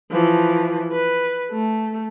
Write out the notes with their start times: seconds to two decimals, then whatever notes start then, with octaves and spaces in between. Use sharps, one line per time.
0.11 E3 F3
0.92 B4
1.51 A3